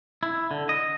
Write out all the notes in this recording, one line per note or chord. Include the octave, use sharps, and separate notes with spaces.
E4
D3
D#5